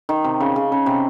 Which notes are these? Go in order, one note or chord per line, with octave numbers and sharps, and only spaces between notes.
D#3
C3
C#3
C#3
C#3
C3